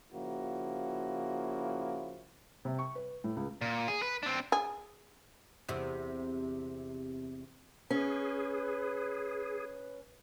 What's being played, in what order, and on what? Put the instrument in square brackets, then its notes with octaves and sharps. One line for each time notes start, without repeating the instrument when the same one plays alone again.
[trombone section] C#3 F3 A#3 E4 F#4
[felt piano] C3
C#6
B4
A2
C#2
[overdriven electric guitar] A#2
G#4
B4
C4 D4
[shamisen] G#4
[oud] E2 C3
[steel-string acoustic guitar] C#4 [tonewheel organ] G#4 [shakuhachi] B4